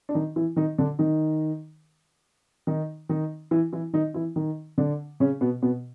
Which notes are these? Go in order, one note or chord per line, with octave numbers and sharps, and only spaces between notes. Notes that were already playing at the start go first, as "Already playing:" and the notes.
D4
D#3 D#4
E3 E4
D#3 D#4
D3 D4
D#3 D#4
D#3 D#4
D#3 D#4
E3 E4
E3 E4
D#3 D#4
E3 E4
D#3 D#4
D3 D4
C#3 C#4
B2 B3
B2 B3